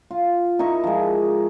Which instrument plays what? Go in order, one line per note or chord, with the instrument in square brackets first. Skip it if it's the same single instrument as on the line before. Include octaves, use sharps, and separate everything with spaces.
[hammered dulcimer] F4
D#4 E4 A#4 C#6
F3 G#3